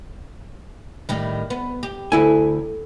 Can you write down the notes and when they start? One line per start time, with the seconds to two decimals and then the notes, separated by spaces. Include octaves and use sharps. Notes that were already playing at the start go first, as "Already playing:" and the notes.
1.09 A2 D#3 G3
1.50 B3
1.83 G4
2.12 D2 E4 A4 G#5